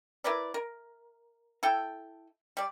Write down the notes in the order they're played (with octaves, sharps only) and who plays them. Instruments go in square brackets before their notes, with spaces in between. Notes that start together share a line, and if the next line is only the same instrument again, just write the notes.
[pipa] E4 A#4 B4 D5
A#4
E4 A4 G5
G3 D5